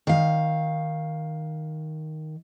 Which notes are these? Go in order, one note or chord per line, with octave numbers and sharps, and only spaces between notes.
D#3 F5